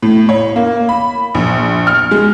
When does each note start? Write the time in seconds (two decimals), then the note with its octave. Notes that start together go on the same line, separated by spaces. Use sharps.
0.02 A2
0.29 C#5
0.56 A#3
0.89 B5
1.35 A#1
1.87 F6
2.11 G#3